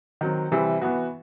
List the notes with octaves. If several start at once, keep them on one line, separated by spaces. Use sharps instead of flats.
D#3 F#3 C4
C3 E3 G3 C4 E4
E3 B3 F#4